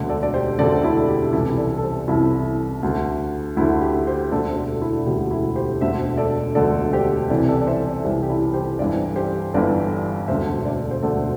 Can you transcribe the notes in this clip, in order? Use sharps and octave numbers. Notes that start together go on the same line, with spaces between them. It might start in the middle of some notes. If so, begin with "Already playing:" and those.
Already playing: E1 D2 D3
A4 D5
D5
G4 C5
E1 D2 D3 A4 D5
E4 A4
G4
C2 C3 E3 E4 A4
A4 D5
A4
G4 C5
C2 C3 E3 E4 A4
D2 D3
D2 D3 E4
G4
G4 C5
E1 D2 D3 A4 D5
A4 D5
E4 A4
E1 D2 D3 G4
E4 A4
G4 C5
E1 D2 D3 C5 E5
A4 D5
E1 D2 D3 A4 D5
G4 C5
C2 C3 E3 A4 D5
A4 D5
D5
C5 E5
A4 D5
C2 C3 E3 G4 C5
G4
E4 A4
G4 C5
G1 G2 E3 A4 D5
G4 C5
G1 G2 E3 A4 D5
E1 D2 D3 C5 E5
A4 D5
C5
E1 D2 D3 A4 D5